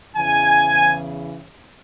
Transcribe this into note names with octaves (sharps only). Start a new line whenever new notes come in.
E2 C#3 E3 G#5